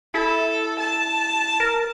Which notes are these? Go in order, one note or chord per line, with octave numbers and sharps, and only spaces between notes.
E4 A4
A5
A#4